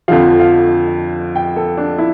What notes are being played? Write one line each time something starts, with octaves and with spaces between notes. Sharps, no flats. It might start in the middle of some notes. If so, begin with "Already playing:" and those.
F2 D3 F3 F5
F5
G5
A4
D4
E4